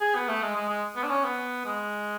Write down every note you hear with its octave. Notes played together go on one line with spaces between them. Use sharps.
G#4
B3
A3
G#3
G#3
G#3
B3
D4
C#4
B3
G#3